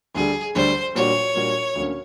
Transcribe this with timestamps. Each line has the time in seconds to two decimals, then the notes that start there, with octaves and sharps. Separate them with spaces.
0.15 D2 D3 G3 G#4
0.55 D2 D3 G3 C5
0.95 A#2 G3 A#3 D4 F#4 C#5
1.36 A#2 G3 A#3 D4 F#4
1.75 D2 D3 F#3 A#3 C#4